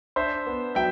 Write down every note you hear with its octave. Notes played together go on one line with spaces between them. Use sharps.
D4 C5 E5
B3
F#3 E5 G5